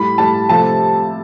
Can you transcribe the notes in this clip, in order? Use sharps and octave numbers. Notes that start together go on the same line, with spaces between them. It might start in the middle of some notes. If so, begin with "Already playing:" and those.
Already playing: A2 G3 B5
A2 G3 A5
C3 F3 A3 A5